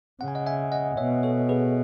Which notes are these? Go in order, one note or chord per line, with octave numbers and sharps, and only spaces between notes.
C#3 F#5
G#5
D#5 F#5
E5 G#5
D#5 F#5
B2 C#5 E5
A4 C#5
G#4 B4